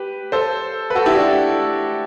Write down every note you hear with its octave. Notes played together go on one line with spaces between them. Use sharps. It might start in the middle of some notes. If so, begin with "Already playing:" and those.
Already playing: G4 B4
A4 C5
B4
F#4 A4
E4 G4
D4 F#4